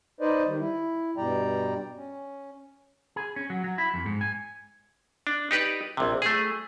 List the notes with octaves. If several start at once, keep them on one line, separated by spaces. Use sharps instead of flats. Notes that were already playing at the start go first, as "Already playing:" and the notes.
D#4 B4 C5 D5 D#5
D#3 G3
E4
G2 B2 G3 D5 G5 A#5
C#4
G#4
C#4
F#3
F#3
E4
F2
G#2
G#5
D4
D#4 G4 B4 D5
A#1 C3
A3 G#4